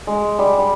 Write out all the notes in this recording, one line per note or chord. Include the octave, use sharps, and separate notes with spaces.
G#3
G3
G3